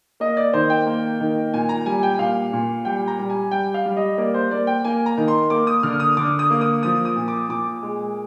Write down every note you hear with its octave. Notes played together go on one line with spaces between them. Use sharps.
A#3 D#5
D5
D#3 C5
G5
A#3
D#3
A#2 G#5
A#5
G3 G#5
G5
A#2 F5
A#2
G3 G5
A#5
G3
G#5
G3 G5
F5
G3
D#5
A#3 D5
C5
A#3 D5
G5
A#3 G#5
A#5
D#3
C6
A#3 D6
D#6
D3 F6
D#6
D3 D6
D#6
A#3
D#6
F3 D#6
D#6
A#2
D6
A#2 D6
G#3